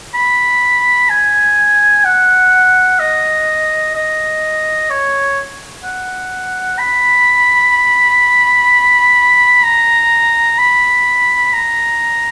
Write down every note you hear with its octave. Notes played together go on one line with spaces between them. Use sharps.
B5
G#5
F#5
D#5
D#5
C#5
F#5
B5
A#5
B5
A#5